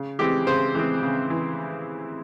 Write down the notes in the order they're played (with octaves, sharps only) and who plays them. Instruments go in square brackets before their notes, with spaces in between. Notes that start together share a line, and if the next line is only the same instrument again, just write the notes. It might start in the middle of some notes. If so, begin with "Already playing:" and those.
Already playing: [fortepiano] C#3
E3 G#3 C4 G4
C#3 C5
E3 G#3 C4
C#3
E3